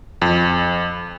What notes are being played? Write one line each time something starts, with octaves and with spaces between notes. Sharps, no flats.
F2